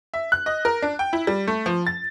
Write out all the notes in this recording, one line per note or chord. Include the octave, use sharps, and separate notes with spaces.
E5
F#6
D#5
A#4
D4
G5
E4
G3
A3
F3
A6